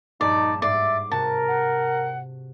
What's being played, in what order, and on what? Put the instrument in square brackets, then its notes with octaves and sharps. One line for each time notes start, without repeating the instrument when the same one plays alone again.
[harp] A#1 G2 [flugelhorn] D#4 [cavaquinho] D5 [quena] A5
[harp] G#2 C7 [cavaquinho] D5 [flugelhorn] E5 [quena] D6
[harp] C3 F#4 [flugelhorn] A#4 [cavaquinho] A5
[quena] F#5